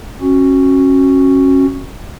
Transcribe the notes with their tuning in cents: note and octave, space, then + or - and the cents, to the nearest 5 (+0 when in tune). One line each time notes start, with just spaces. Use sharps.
C#4 -25 F#4 +0